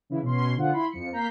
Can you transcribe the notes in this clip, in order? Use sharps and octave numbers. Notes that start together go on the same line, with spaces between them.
C#3 E3 E4
B2 C#4 C6
D3 F3 F4 F#5
E4 B5 C6
F2 F3 C#7
A#3 A#5 G6 B6 C7